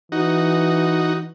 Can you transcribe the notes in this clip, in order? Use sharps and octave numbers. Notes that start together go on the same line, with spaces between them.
E3 D#4 F#4